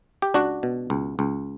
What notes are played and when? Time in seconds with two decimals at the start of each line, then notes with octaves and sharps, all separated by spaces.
0.22 G4
0.34 C#2 D4 F#4
0.63 B2
0.90 C#2
1.19 C#2